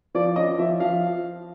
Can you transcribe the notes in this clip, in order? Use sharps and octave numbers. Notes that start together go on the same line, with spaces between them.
F3 D5
C#4 D#5
F3 E5
F3 F5